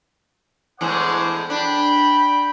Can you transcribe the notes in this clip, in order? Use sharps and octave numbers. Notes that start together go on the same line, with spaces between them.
E2 A2 G#3 C5 F#5 D6
D4 G5 B5